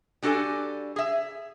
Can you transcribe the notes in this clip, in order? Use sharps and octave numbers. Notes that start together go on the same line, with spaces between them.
G3 D4 F#4 A4 D5 G#5
G#4 E5